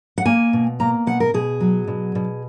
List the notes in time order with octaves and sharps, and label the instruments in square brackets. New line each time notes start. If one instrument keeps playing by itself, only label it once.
[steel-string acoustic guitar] F#5
A#3 G#5
B2
A#3 A#5
B2 F#5
A#4
B2 G#4
F#3
B2
B2